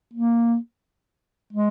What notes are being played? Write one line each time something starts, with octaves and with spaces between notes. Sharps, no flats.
A#3
G#3